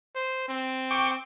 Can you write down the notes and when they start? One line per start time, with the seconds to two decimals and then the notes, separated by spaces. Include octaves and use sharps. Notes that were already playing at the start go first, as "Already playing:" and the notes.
0.16 C5
0.49 C4
0.91 G5 C#6 D6